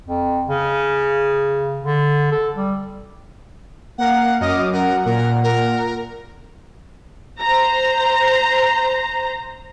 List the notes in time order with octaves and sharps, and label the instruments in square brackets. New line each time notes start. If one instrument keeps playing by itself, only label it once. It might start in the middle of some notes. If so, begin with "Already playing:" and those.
[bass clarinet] F2
C#3
D3
A4
G3
[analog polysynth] A#3 A#4 F5 [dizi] F#5
[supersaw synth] F#2 [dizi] D#5 [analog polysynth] D6 D#6 F6
[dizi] A#4 [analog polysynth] F#5
[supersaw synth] A#2 [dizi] A#4
[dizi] A#4
[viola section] C5 A#5